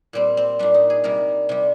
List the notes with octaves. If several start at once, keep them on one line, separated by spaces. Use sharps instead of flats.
A#2 G3 C4
C4
A#2 G3 D4
D#4
G#4
C3 G3 A#4
C3 G3